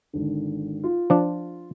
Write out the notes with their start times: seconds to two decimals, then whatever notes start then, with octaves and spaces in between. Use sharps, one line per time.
0.13 G#1 D3
0.84 F4
1.10 F3 D4